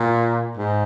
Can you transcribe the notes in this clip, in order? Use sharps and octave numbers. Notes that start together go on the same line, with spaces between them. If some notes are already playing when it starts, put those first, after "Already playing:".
Already playing: A#2
G#2